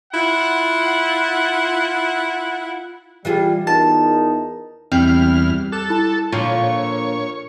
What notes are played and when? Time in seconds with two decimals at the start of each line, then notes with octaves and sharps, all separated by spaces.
0.13 E4 F4 F#5
3.25 E3 G3 F4 G#4
3.67 E2 D#4 A#4 A5
4.92 E2 G3 C4 F6 G6 C7
5.72 A4 D6 F#6 E7
5.90 E4 A5
6.32 A#2 D3 F3 F4 C#5